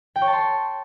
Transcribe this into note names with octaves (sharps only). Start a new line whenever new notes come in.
G5
C#5
A5
C6